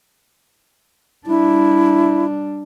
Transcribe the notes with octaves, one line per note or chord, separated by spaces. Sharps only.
G3 D4 E4